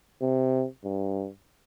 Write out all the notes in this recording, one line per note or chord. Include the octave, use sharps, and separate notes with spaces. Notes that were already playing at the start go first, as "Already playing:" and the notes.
C3
G2